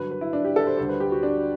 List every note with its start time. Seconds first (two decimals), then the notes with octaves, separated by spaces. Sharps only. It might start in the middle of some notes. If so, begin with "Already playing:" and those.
Already playing: G2 D3 F#3 B4
0.11 B4
0.21 E4
0.33 D4
0.45 G4
0.56 A4
0.67 C5
0.77 D2 D3 G3 C5
0.89 B4
1.00 G4
1.12 F#4
1.23 D4